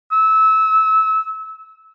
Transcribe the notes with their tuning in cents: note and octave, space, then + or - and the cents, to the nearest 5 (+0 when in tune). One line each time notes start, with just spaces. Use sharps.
E6 -25